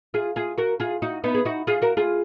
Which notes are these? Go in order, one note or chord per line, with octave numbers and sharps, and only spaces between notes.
F4 G#4
F4 G#4
F#4 A#4
F4 G#4
D#4 F#4
B3 D#4
G#4
D#4 F#4
F4 G#4
F#4 A#4
F4 G#4